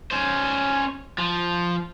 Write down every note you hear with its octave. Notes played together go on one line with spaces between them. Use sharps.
C#4 C5
F3